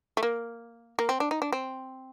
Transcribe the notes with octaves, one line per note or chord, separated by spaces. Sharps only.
A3
A#3
A#3
C4
D4
D#4
D4
C4